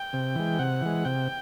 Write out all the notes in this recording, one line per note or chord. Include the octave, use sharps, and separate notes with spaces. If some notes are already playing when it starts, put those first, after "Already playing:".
Already playing: G5
C3
E3 G#3
C3 F#5
E3 G#3
C3 G5